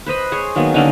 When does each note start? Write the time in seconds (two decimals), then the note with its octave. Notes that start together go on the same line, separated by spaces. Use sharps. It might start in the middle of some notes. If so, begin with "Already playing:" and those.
0.06 B4 C5 D#5 B5
0.32 G#4 C5 C#5
0.55 D#3 F#3 A#3 B3
0.74 D3 A#3 C#4 D#4